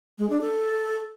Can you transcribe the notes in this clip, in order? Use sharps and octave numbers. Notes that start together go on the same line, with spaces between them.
G#3
D4
A4